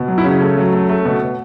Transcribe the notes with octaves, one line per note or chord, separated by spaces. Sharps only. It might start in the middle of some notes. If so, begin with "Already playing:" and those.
Already playing: B2
F#3
E4
C#3 C#4
A3
F#3
A3
A3
B2
B2